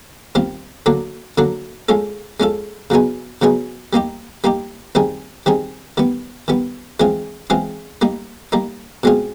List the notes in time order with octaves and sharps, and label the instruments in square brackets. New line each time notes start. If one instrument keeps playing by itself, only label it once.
[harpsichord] D#3 G3 C4 F4
D3 F#3 A#3 D4
D3 F#3 A#3 D4
G#3 C#4 F4 A4
G#3 C#4 F4 A4
C#3 F#3 B3 D#4 G#4
C#3 F#3 B3 D#4 G#4
G3 A#3 D#4 G4
G3 A#3 D#4 G4
D#3 G3 C4 D#4 G#4
D#3 G3 C4 D#4 G#4
D#3 G3 B3
D#3 G3 B3
E3 G#3 C4 F4 G#4
E3 G#3 C4 F4 G#4
G3 A#3 D#4
G3 A#3 D#4
B2 G#3 C4 F4 G#4